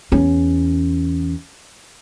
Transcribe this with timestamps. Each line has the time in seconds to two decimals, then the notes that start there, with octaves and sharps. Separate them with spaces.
0.12 E2 C#4